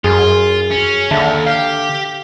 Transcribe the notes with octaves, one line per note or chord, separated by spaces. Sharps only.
F#2 F4 G#4 G#5
C#4
D#2 D3 E5 A5
G4 F5